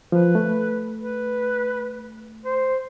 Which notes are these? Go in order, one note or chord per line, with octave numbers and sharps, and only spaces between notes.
F3 B4
A3
B4
C5